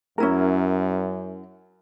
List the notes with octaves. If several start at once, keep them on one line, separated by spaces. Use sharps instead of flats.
F#2 C#4 E4 A#4